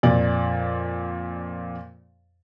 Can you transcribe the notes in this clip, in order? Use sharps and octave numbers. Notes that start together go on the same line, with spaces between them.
F2 A#2 D5